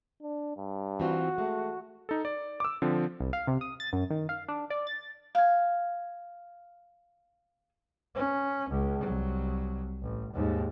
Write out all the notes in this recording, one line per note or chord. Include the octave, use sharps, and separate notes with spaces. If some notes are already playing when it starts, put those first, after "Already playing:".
D4
G2
E3 C4 F4 F#4
G#3 A3
D#4 A4
D5
D6 E6
D3 F3 C4
C2
F5
C3
D#6
A6
F#2
D#3
F5
D4
D5
A6
F5 G#5
C#4
C#2
C2 F#3
A1
D#2 G#2